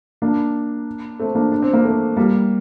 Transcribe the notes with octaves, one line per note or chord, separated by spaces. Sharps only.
A#3 D4
A3 C4
A#3 D4
D4
C4
A#3
A3 C4
G3 A#3